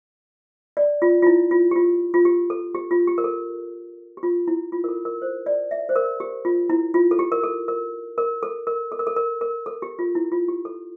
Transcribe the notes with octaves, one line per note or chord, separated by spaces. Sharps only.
D5
F4
F4
E4
F4
G4
F4
F4
G4
A4
G4
F4
G4
A#4
A4
G4
F4
E4
F4
A#4
A4
A#4
C5
D5
E5
C5
A#4
G4
F4
E4
F4
A4
G4
A#4
A4
A#4
A#4
A4
A#4
A4
A#4
A4
A#4
A#4
A4
G4
F4
E4
F4
G4
A4